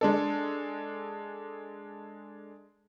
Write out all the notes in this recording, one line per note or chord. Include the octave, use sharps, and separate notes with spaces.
G#3 D4 A4